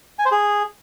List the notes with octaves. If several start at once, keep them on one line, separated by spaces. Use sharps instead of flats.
G#5
C5
G#4